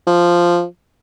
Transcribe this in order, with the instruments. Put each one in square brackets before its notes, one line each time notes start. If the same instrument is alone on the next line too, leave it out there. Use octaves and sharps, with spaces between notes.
[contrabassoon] F3